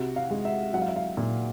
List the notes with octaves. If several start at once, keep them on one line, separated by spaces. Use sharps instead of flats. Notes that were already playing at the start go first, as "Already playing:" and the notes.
Already playing: C3 F#4 F#5
F5
G#3
E5
F#3 F#5
F5
E5
F5
A#2